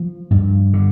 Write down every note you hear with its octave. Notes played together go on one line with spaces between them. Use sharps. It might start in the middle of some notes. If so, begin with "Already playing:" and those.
Already playing: F3
G2
D3